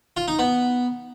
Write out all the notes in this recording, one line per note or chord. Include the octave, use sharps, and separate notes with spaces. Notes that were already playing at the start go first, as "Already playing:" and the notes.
F4
D#4
B3